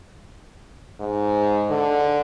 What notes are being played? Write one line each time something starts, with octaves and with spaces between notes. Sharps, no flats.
G#2
D3